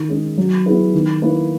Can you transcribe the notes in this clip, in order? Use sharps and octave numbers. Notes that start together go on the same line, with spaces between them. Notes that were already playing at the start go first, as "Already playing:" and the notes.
Already playing: D#3
G#3 C#4 G#4
F#3
B3 E4 G#4 B4
D#3
A#3 E4 B4